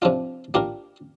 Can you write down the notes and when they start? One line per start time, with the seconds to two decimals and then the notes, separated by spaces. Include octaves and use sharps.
0.02 C3 F3 D4 F4
0.54 A#2 A#3 D4 G4 A#4